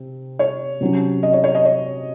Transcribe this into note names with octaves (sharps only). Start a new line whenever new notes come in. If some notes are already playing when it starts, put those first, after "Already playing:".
Already playing: C3 C4
C#5
C3 F#3 C#4
D#5
C#5
C#5
D#5
C#5